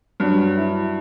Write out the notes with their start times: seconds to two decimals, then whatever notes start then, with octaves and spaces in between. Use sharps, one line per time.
0.20 G2 F#3
0.57 E4